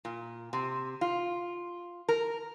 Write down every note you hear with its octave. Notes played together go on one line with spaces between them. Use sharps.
A#2
C3
F4
A#4